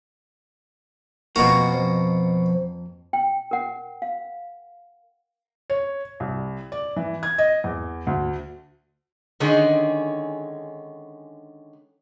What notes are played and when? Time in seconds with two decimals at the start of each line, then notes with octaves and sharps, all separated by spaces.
1.36 F2 B2 A#3 F#4
1.74 F3
3.13 G5
3.51 A#4 F#5
4.02 F5
5.70 C#5
6.20 C2
6.72 D5
6.97 E3
7.23 G#6
7.38 D#5
7.64 E2
8.07 D2
9.40 D3 D#3 G#3 C#4 G#4